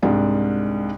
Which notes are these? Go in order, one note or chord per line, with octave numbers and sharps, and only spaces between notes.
C2 G#2 D4